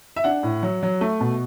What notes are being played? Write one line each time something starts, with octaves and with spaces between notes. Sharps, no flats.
E5
D4 F#5
A2
F#3
F#3
A3
B2